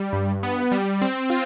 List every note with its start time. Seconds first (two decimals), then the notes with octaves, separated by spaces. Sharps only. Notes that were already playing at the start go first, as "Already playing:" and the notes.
Already playing: G3
0.13 G2
0.43 B3
0.72 G3
1.02 C4
1.30 F4